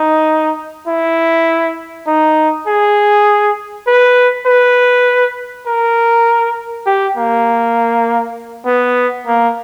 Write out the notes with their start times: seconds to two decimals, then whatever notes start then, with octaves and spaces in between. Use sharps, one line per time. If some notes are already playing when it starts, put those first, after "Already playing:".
Already playing: D#4
0.88 E4
2.07 D#4
2.67 G#4
3.88 B4
4.47 B4
5.67 A#4
6.87 G4
7.17 A#3
8.66 B3
9.27 A#3